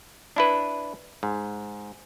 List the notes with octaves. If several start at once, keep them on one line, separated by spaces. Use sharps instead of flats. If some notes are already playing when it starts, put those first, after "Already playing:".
D4 E4 B4
G#2